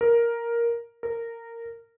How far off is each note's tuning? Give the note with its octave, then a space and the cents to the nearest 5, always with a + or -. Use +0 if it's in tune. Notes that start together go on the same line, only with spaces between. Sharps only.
A#4 +5
A#4 -15